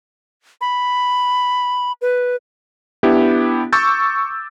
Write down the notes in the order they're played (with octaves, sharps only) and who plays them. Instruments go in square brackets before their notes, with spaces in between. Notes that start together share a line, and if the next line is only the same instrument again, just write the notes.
[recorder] B5
B4
[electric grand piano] B3 D4 E4 G4
C#6 D6 E6 G6 A6